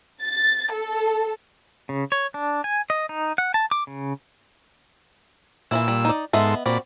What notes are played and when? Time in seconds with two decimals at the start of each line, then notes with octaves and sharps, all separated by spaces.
0.22 A6
0.73 A4
1.89 C#3
2.12 C#5
2.34 D4
2.64 G#5
2.90 D#5
3.09 D#4
3.38 F#5
3.54 A5
3.71 D6
3.87 C#3
5.71 A#2 E3 F#3 E4 E6
5.88 G3
6.05 D#4 D5
6.33 G#2 B3 A4 D#5 E5 C6
6.66 A#2 C4 F#4 D5 B5